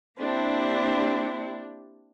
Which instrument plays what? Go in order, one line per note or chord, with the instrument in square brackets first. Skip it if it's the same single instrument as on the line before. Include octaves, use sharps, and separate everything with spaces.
[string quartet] A#3 C4 E4 [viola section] D4 G4